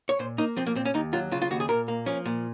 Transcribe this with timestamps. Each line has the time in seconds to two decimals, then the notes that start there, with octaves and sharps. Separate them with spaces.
0.09 C#5
0.19 A#2 C5
0.38 A#3 D#4
0.57 F3 C4
0.66 A#3
0.75 A#2 C4
0.85 C#4
0.94 D#2 D#4
1.13 F#3 F4
1.31 C#3 F4
1.42 F4
1.51 D#2 F#4
1.60 G#4
1.69 A#2 A#4
1.88 A#3
2.06 F3 C#4
2.26 A#2